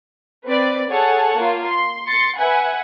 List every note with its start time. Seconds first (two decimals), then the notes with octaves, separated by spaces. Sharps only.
0.46 C4 B4 D5
0.90 G#4 A4 C#5 F#5 A5
1.34 A#3 F4
1.66 C6
2.08 C6 A6 C#7
2.38 B4 E5 F#5 G#5